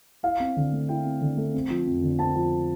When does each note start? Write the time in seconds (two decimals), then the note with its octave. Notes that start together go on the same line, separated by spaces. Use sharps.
0.23 E4 F5
0.40 C4
0.57 D3
0.73 A3
0.89 E4 G5
1.05 C4
1.22 D3
1.37 A3
1.54 C4
1.70 F3
1.87 F2
2.03 D3
2.19 C4 A5
2.36 F3